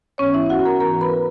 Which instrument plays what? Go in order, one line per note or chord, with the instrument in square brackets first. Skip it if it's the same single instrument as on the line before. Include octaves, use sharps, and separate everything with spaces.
[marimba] G#2 E3 B3 C#4 C#5
E4 E5
F#4 F#5
A#4 A#5
G#2 E3 B3 A#4 A#5
B4 B5